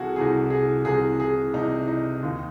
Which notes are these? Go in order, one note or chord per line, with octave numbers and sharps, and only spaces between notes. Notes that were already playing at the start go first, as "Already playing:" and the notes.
Already playing: C2 C3 E3 F#4 G#4 A4
C2 C3 E3 G#4
G#4
C2 C3 E3 G#4
G#4
C2 C3 E3 D#4
D#4
D#2 D#3